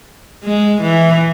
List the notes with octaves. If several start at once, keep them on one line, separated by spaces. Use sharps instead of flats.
G#3
E3